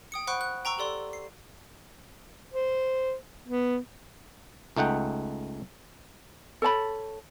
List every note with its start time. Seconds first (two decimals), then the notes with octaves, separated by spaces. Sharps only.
0.12 G5 D#6 C#7
0.27 C5 F#5 B5 C#6 F#6 D7
0.41 F#6
0.65 G5 A#5 C#6 E6
0.78 G4 A4 D5 C6
1.13 C7
2.53 C5
3.48 B3
4.77 C#2 A3 D#4 F#5 G5
6.62 A4 C#5 A5 B5